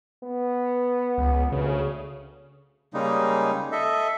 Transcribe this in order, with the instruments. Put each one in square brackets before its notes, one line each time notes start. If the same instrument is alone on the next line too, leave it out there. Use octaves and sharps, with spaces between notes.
[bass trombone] B3
[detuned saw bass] C#2
[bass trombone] D2 [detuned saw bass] C#3
[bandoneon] C#3 G3 G#3 A#3 D#4
A4 D#5 E5